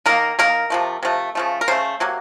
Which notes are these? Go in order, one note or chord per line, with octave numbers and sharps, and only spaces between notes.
D#3 A#3 A#4
D#3 A#3 A#4
C3 F3 A3
C3 F3 A3
C#3 F3 A3
A#4
C#3 A3 C5
C3 F#3 A#3